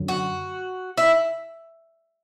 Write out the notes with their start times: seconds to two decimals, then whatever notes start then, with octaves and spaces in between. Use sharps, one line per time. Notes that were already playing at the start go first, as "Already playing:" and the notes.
Already playing: F#2 D3 F#3
0.08 F#4
0.97 E4